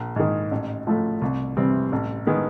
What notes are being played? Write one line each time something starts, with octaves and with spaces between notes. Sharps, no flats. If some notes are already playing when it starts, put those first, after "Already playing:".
Already playing: A#1
G#2 D#3
A1
A2 F3 A3
C2
C3 E3 G3 C4
A1
D#3 G#3 B3